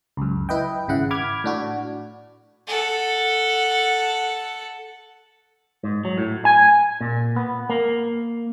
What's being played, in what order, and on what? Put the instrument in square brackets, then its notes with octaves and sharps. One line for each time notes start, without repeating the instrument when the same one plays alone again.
[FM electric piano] C#2 F#2
E4 B4 D#5 G5
G#1 C#3 E4 F#5
B5 D6 F6 G#6
A2 D4 F#4
[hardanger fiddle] A4 F#5
[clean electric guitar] G#2
F#3
A2
G#5
A#2
B3
A#3